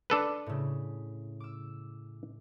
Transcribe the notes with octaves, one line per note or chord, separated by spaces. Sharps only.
D4 A4 B4
A2 C#3
D6 E6